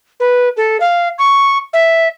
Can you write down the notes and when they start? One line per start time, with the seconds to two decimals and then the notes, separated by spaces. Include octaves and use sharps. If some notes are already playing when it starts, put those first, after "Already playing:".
0.20 B4
0.57 A4
0.80 F5
1.18 C#6
1.73 E5